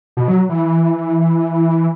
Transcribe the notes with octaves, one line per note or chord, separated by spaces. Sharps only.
B2
F#3
E3